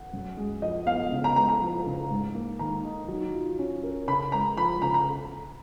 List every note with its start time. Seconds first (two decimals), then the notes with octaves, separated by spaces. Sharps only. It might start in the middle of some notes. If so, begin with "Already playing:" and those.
Already playing: F#5
0.13 F#2
0.37 G#3
0.62 F3 D#5
0.86 B3 F5
1.12 C#3
1.24 A#5
1.36 G#3 A#5
1.49 A#5
1.61 F3
1.86 C#3
2.10 G#2
2.35 A#3
2.59 D#3 A#5
2.84 D#4
3.08 F#3
3.34 F4
3.59 C#4
3.83 A#4
4.07 C#3 B5
4.32 G#3 A#5
4.57 F3 B5
4.82 C#3 A#5
4.94 A#5